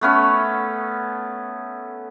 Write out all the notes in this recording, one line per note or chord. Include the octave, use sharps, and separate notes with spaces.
A3 B3 C#4 A4